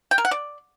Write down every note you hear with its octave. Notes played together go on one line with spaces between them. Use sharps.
G5
A#4
F#5
D5